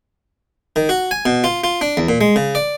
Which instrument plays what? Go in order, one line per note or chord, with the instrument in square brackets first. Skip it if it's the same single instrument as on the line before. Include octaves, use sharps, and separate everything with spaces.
[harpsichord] D#3
F#4
G#5
B2
F4
F4
D4
E2
A#2
G#3
C#3
D5